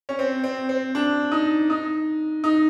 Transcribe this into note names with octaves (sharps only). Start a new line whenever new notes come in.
C#4
C4
C4
C4
D4
D#4
D#4
D#4